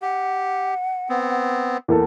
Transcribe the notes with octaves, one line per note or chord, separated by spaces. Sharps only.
G4 F#5
B3 C4
E2 A#3 A4